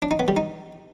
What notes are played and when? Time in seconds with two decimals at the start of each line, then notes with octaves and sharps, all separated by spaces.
0.02 D4
0.11 D#4
0.19 B3
0.28 G3
0.37 D#4